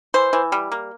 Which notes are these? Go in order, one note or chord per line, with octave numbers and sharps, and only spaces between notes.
E3 C5
E3
G3
A#3